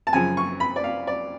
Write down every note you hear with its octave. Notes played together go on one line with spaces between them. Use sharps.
A5
F#2 C#3 F3 G#5
C#6
B5
D5
F5
D5